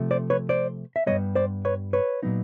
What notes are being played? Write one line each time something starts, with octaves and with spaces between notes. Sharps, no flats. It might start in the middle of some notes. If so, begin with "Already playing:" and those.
Already playing: C3 F3 A3
C5 D5
B4 C#5
C5 D5
E5
G2 E3 G3 B3 C#5 D#5
C5 D5
B4 C#5
B4 C#5
A#2 F#3 B3 D#4